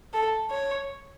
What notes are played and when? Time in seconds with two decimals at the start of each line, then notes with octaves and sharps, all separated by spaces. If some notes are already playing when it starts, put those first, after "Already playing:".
0.13 A4
0.50 C#5